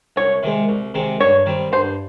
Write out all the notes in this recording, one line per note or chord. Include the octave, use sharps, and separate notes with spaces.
C2 C#5
C3 D#3 G#3 C4
C2
C3 D#3 G#3 C4
G2 C#5
D#3 G3 C4
G2 C5